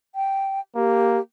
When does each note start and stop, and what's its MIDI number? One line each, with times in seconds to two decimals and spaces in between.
0.15 0.60 79
0.76 1.18 58
0.76 1.20 67